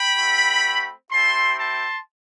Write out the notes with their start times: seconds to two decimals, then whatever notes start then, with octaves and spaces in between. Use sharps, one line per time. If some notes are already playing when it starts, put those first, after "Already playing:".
Already playing: G5 B5
0.17 A3 C4 F#4
1.11 C4 E4 G4 A5 C6
1.58 A5 C6